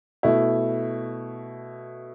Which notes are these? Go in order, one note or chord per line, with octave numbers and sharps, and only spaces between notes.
B2 A3 E4